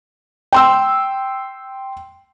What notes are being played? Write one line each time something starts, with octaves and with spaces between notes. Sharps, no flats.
G5 C6 E6